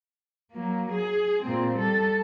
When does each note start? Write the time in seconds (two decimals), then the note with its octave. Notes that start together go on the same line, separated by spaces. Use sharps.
0.51 F#3 A#3
0.91 G#4
1.42 A#2 C4
1.75 G3 A4